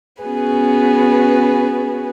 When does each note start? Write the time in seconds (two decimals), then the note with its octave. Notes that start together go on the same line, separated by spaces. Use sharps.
0.23 B3 C#4 F#4 G#4 B4